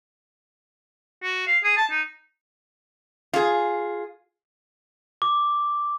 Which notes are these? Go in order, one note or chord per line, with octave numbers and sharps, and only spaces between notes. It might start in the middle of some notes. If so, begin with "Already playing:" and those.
F#4
F5
G#4
A5
D#4
F4 G#4
D6